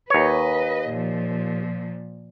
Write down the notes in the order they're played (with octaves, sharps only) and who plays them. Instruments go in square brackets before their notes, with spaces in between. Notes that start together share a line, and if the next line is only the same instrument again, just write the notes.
[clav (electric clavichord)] D#2 C#5 [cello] B4 D#5
[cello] A#2 F3